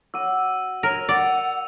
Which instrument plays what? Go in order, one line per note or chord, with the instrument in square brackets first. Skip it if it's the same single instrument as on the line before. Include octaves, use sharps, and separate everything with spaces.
[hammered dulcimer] F#4 D6 [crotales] E6 D#7
[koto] A#4 [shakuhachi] C#5 [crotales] F7
[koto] D5 [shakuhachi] F#5